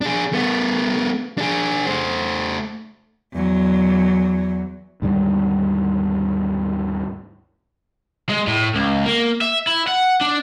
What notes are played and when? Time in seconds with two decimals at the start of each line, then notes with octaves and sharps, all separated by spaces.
0.01 D4 G#4
0.33 A3 B3
1.38 D4 G#4
1.87 A3 C5
3.33 E2 F#3
5.02 D#2 G#2 D3 G3
8.29 G#3
8.48 A2
8.75 C#2
9.06 A#3
9.41 E5
9.67 E4
9.88 F#5
10.21 D4